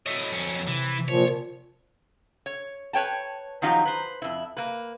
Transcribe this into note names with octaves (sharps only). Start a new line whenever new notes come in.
E4 F#4 A4 C#5 D#5
F2 C#4
C3 E3
A#2 F3 C#5
C#5
B4 C#5 G5 A5
D#3 F3 F#3 D#4 F4 G4
B4 C5
F2 E4
A#3 B4